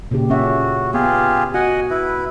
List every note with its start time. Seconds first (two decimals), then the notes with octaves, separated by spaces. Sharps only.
0.11 A#2 C#3 G4
0.30 C#4 F#4 E5
0.94 B3 F4 G4 G#4
1.54 F#4 D#5 F#5 G#5
1.90 E4 B4